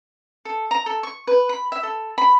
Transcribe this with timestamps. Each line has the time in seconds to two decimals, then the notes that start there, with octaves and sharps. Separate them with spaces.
0.45 A4
0.71 A#5
0.86 A4
1.03 C#6
1.27 B4
1.49 B5
1.72 E5
1.83 A4
2.18 B5